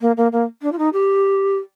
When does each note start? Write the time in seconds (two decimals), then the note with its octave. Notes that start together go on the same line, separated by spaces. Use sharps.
0.01 A#3
0.17 A#3
0.32 A#3
0.62 D4
0.72 F4
0.78 D#4
0.93 G4